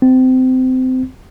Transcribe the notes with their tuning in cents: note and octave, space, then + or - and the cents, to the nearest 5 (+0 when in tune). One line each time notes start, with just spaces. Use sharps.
C4 -25